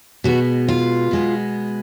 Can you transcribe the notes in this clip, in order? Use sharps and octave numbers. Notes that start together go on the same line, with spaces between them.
B2 G#3 B3 F#4
F4
B2 G#3 B3